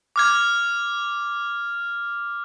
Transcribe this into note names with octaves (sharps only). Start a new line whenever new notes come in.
D6 F6 G#6